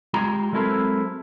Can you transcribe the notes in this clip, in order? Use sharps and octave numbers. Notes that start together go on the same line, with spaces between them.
G#3 F4 G4 A#5
F#3 G#3 C4 E4 A4 A#4